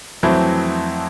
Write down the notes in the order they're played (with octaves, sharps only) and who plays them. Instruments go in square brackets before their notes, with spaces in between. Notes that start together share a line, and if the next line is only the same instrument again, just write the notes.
[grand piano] F2 E3 F#3 A3 C4 E4